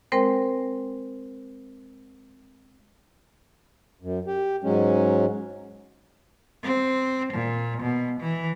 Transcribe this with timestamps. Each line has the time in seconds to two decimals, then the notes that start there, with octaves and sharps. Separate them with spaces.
0.12 G#3 C4 A#4 C5 G5
4.02 F#2
4.27 G4
4.64 G#2 F#3 G#3 C#4
6.63 C4
7.34 A#2
7.82 B2
8.20 E3